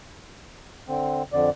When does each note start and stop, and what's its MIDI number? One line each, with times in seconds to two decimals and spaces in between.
0.88 1.23 50
0.88 1.23 60
1.33 1.50 41
1.33 1.50 50
1.33 1.50 74